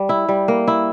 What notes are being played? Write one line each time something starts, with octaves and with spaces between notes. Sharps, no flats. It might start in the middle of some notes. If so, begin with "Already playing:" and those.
Already playing: G3
E4
G3
A#3
E4